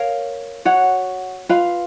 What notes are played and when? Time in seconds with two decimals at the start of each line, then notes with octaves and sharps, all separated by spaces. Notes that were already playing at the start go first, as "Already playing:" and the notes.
Already playing: A#4 C#5 F5
0.65 F#4 C#5 F#5
1.49 F4 B4 F5